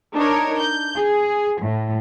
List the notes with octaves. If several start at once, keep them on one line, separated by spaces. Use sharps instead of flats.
D4 D#4 A#4 C#5
G6
G#4
A2